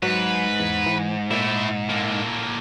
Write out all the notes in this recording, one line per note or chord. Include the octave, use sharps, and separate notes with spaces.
G#2 F#3 B4
E2
E3
A#2 A3 E4
A2 A#3